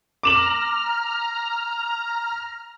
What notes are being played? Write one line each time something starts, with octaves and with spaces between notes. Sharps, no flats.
A#5 D6 F6 E7 F#7